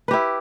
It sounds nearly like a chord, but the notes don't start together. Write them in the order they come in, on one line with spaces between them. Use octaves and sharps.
B4 G4 E4